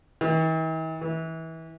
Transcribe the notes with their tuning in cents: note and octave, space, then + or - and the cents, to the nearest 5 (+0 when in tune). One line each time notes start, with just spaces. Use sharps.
E3 -45
E3 -25